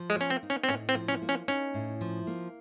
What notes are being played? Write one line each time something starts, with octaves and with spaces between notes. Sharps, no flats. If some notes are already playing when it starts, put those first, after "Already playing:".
Already playing: F3
G#3
A#3 C#4
C4
D#4
C#4
C4
A2 C#4
C4
F3
C#4
A#3
C#4
C#4 D#4
A2
F3
A#3